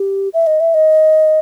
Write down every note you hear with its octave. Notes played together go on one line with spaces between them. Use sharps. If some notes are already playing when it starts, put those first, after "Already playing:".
Already playing: G4
E5
D#5
E5
D#5